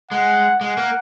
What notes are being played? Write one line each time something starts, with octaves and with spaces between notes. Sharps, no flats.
G#3 F#5
G#3 F#5
A#3